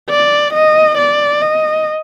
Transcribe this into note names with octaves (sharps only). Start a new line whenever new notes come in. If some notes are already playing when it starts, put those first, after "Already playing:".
D5
D#5
D5
D#5